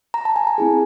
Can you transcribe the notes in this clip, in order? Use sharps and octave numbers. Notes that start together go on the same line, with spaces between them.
A#5
A5
G#5
A#5
C4 E4 G#4